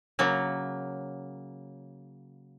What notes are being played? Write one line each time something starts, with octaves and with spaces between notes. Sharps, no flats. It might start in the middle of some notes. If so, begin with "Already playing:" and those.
C#3 F#3 A#3